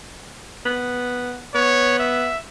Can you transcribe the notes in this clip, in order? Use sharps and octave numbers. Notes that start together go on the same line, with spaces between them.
B3
B3 C#5
E5